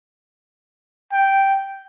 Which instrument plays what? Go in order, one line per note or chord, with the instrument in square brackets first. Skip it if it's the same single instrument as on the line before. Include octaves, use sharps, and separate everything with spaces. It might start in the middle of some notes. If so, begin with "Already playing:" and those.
[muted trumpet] G5